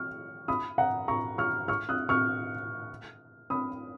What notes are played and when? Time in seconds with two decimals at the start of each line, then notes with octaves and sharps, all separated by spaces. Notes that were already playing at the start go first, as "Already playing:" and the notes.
Already playing: C#6 F6
0.48 B5 D#6
0.78 F#5 A#5
1.08 A#5 C#6
1.38 C#6 F6
1.68 C#6 F6
1.89 D#6 F#6
2.09 C#6 F6
3.50 B5 D#6